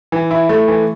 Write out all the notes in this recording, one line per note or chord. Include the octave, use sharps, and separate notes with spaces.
E3
E4
A3
E3